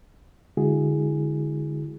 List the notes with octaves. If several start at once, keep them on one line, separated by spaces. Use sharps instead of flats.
D3 G#3 E4 F#4 G#4